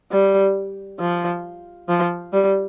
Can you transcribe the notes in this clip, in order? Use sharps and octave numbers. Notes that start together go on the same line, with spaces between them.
G3
F3
F3
G3